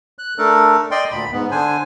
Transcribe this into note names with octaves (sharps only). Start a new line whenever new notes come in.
F#6
A3 D4 A4 A#4
D5 D#5 G5 C6
D2 A#2 B5
G#2 B3
D3 D4 C5 G#5